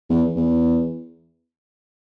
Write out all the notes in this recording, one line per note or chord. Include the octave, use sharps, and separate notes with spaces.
E2
E2